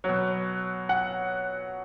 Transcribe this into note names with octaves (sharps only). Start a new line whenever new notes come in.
B2 F#3
F#5